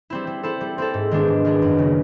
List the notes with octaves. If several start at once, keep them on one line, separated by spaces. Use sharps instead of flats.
G3 C4 E4
G3
C4 E4 A4
G3
C4 E4 A4
G#2
D#3 G#3 B3 D4
G#2
D#3 G#3 B3 D4
F#2
C#3 F#3 A#3